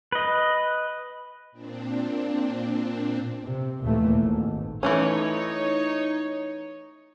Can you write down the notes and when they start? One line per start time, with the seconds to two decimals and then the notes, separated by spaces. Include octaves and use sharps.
0.12 B4 D#5
1.52 A#2 C4 D4
3.44 C3
3.82 D#2 A#2 E3 A3 A#3
4.17 G#1
4.83 E3 A3 C#4 D#4 C#5